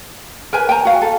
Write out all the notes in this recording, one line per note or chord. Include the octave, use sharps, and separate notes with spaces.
A#4 B4 G#5
G5 G#5 A#5
F#4 F5
A4